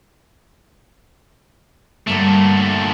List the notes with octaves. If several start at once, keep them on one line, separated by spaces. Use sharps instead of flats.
G2 A#2 D3 A3 D4